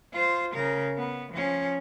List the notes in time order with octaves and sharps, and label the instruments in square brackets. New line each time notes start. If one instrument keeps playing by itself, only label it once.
[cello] F4 C5
C#3 A#4
B3
F3 C#4